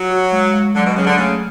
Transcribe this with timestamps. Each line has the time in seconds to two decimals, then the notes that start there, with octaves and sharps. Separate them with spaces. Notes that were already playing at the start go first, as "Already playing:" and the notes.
Already playing: F#3
0.11 F#4
0.32 G#3
0.53 G#3
0.75 D3 F#3
0.86 B2
0.96 C#3 F#3
1.07 D3
1.17 C#3 A3